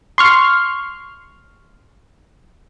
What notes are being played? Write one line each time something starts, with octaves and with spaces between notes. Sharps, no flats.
C6 C#6 F6